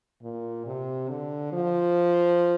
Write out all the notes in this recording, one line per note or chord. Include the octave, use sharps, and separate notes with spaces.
A#2
C3
D3
F3